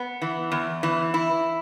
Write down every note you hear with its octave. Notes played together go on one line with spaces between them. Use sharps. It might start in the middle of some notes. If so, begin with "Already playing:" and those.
Already playing: B3
E3
E2
E3
E4